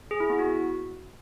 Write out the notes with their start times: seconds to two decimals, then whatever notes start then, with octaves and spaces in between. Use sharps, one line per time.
0.11 G#4
0.20 E4
0.30 B3
0.39 F#4